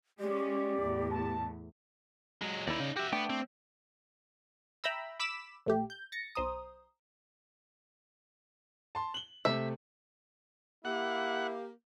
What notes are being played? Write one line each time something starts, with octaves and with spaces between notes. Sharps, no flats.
G#3 C#4 G4 D5
E2 A2
A5
F#3 G#3
D#2 D#4 E4 D5
C#3
F#4 G4 E5
A3 B3 D4 G5
C4
E5 G5 A#5 B5 E6
B5 D6 E6 B6 E7
A#1 A3 G4
G6
A6 A#6 C#7
B1 C5 A#5 D#6
A5 C6
F#7 G7
C3 A3 C4 E5
A#3 E4 G4 F#5